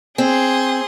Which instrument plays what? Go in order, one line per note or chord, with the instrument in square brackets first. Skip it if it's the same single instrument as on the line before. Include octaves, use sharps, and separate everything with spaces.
[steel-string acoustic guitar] C4 [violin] G#4 C6